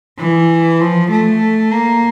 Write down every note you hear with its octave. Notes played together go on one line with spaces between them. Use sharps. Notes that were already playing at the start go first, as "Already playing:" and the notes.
E3
F3
A3
A#3